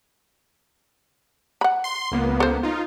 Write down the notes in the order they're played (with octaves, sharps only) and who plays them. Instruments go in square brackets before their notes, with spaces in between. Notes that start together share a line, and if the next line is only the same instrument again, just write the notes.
[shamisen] F#5 B5
[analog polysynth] C6
C#2 A#3 B3
[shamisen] A4 C5
[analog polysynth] D#4 F4